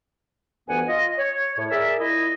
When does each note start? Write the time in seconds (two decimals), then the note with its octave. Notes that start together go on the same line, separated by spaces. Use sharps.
0.68 D2 G2 E3 B3 F#5 G#5
0.87 F4 D#5
1.18 C#5
1.57 A2 C#5
1.70 G#4 A#4 D5 E5
1.99 A#2 E4 D#5